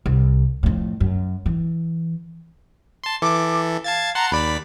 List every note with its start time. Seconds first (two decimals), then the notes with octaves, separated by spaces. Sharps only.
0.06 C2
0.63 F2 A2
1.00 F#2
1.46 E3
3.04 A5 C6
3.22 E3 A4 D6
3.84 F5 A5 G#6 A6
4.15 F#5 A5 A#5 C6
4.32 D#2 D5 B5 B6